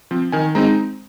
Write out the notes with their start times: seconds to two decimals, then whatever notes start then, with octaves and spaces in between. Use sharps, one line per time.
0.11 F3 C4
0.32 D#3 G#5
0.55 G#3 C4 D#4 A#5